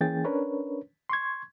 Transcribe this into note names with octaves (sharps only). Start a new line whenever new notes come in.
E3 A#3 C#4 G#4 G5 A6
C#4 D4 A#4 B4 C#5
C6 C#6 G#6